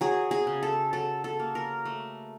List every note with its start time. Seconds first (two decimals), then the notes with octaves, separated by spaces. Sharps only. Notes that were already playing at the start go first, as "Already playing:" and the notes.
0.01 F#3 G#4
0.31 G#4
0.47 C#3
0.63 A4
0.93 F#3 A4
1.24 A4
1.39 A#3
1.55 A#4
1.85 A3